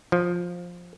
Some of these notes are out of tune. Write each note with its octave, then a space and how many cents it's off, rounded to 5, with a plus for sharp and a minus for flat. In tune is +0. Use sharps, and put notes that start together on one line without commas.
F3 +10